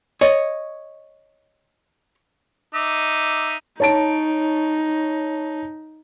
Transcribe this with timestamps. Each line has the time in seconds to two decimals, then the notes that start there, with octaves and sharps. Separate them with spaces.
0.21 C#5 D#5
2.74 D#4 E5 D6
3.80 D#4 C#5 A5 D7